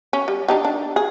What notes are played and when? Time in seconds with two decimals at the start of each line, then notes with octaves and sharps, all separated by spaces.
0.13 C#4
0.28 G3
0.48 D4 D#4 G4
0.65 D4
0.96 G#4